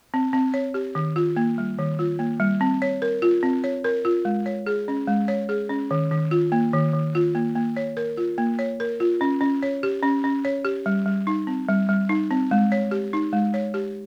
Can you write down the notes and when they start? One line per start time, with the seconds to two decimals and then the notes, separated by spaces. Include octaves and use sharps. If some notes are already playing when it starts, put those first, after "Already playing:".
0.14 C4
0.33 C4
0.54 C#5
0.74 G4
0.95 D#3
1.16 F4
1.37 A#3
1.58 G3
1.78 D#3
1.99 F4
2.19 A#3
2.40 G3
2.61 C4
2.82 C#5
3.02 A#4
3.22 F4
3.43 C4
3.64 C#5
3.84 A#4
4.05 F4
4.25 G#3
4.46 C#5
4.67 G#4
4.88 C#4
5.08 G#3
5.28 C#5
5.49 G#4
5.69 C#4
5.91 D#3
6.11 D#3
6.31 F4
6.52 A#3
6.73 D#3
6.93 D#3
7.15 F4
7.35 A#3
7.56 A#3
7.77 C#5
7.97 A#4
8.17 F4
8.38 A#3
8.59 C#5
8.80 A#4
9.00 F4
9.21 C#4
9.41 C#4
9.63 C#5
9.83 G4
10.03 C#4
10.24 C#4
10.45 C#5
10.65 G4
10.86 G3
11.06 G3
11.27 D#4
11.47 C4
11.68 G3
11.89 G3
12.09 D#4
12.31 C4
12.51 G#3
12.72 C#5
12.91 G4
13.13 D#4
13.33 G#3
13.54 C#5
13.74 G4